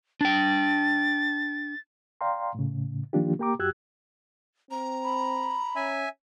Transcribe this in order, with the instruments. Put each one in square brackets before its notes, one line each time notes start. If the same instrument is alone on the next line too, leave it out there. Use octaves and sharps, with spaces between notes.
[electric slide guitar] D4 G5 [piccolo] A6
[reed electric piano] D5 F5 G5 A#5 C6
A2 C#3
D#3 F3 A#3 D4 F4 G4
A#3 G4 G5 A#5 D6
F#2 F#4 G4 E6 F#6 G#6
[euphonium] C4 [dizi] A#5
[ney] B5
[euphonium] C#4 [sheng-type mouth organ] E5 G#5